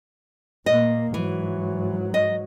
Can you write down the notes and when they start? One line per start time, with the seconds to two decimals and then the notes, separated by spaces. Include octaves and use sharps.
0.66 A#2 A#3 D#5
1.14 G#2 E3 F#3
2.14 D#5